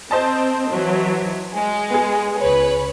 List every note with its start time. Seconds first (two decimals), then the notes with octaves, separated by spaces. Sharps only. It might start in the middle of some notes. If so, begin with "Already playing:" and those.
0.11 C4 C5 D#5 A5
0.71 E3 F#3
1.54 G#3
1.90 B3 G#4
2.38 C#2 B4 C#5